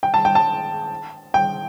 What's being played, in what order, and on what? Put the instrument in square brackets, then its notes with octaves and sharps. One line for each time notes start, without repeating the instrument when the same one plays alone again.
[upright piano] G5
A5
G5
A5
G5